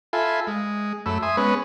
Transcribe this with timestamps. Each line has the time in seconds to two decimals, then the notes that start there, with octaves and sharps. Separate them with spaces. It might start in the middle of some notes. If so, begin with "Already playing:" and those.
0.13 F4 A4 E5 G#5 B5
0.47 G#3
1.06 F#2 A3 B5 E6
1.22 E5 G#5 C6 D#6
1.37 G#3 B3 C#4 B4